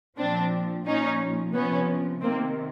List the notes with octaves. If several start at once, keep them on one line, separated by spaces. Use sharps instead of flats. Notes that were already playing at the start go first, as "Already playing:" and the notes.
A#2 F3 C4 D4
A#2 F3 C#4 D#4
C3 F3 B3 C#4
C3 D#3 A#3 C4